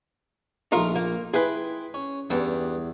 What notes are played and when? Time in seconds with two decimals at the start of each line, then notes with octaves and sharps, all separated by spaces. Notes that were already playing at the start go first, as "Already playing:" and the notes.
0.72 A#1 A3 D#4 F4 A#4
0.96 A#3
1.34 E4 G#4 B4 G5 C6
1.94 C#4
2.30 E2 G2 B4 G5